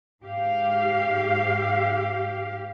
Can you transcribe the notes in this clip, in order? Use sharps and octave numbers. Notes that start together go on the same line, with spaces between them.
G#2 G4 F5